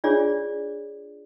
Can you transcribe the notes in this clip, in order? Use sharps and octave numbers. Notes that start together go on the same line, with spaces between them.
D4 F4 G#4 C#5 D5